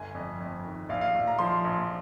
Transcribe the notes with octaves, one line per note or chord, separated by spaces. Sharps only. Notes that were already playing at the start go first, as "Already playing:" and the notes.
Already playing: G1 G#5
F2
F2
D#3
A#1 F5
F5
A#1
A#5
F3 C6
A#1